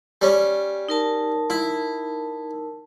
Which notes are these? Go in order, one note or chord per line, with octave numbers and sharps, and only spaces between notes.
G3 C#4
D#4 A#4 A5
E4